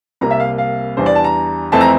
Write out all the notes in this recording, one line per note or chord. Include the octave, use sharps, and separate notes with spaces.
C2 C3 G3 A#3 A#5
E5
F5
F5
E2 E3 G3 D4 C5
D5
A5
A#5
F2 E3 A3 C4 A5
A#5